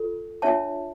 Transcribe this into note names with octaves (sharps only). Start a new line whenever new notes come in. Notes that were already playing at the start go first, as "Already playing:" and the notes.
Already playing: F4 A4
D4 F4 C#5 E5 A5